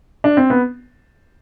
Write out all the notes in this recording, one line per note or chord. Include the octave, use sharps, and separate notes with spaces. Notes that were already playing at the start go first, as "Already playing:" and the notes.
D4
C4
B3